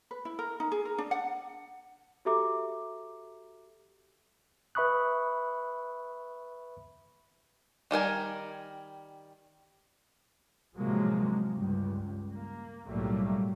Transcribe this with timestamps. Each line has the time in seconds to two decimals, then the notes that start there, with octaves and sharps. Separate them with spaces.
0.11 B4
0.25 E4
0.39 A#4
0.60 D#4
0.72 G#4
0.85 A#4
0.98 D4
1.11 F#5
2.25 F#4 G4 A4 E5 A#5 D6
4.75 B4 E5 B5 C#6 D#6 F#6
7.91 D#3 G3 A#4 G#5
10.76 A2 C3 F3 F#3 G#3 A#3
11.53 C#2 G2 G3
12.32 A#3
12.88 B1 A2 F#3 G3 A3 A#3